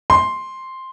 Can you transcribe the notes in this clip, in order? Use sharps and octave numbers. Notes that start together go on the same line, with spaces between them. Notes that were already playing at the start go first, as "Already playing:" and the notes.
C6